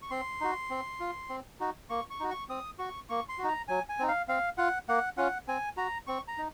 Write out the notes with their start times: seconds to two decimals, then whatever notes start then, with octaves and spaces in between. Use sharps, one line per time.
0.02 C#6
0.11 C4 C6
0.41 D#4 F#4
0.70 C4
1.00 F4
1.29 C4
1.60 D#4 F#4
1.90 A#3 C#6
2.10 C#6
2.20 D#4 F#4
2.30 C#6
2.49 C4 D#6
2.79 F#4 C#6
3.09 A#3 C#6
3.29 C6
3.38 F#4
3.44 D#4 A#5
3.68 F#3 G#5
3.89 G#5
3.99 C4 D#4
4.08 F5
4.28 C4 F5
4.58 F4 F#5
4.89 A#3 F#5
5.17 C#4 F4 F#5
5.48 C4 G#5
5.77 F#4 A#5
6.07 C4 C#6
6.28 A#5
6.38 D#4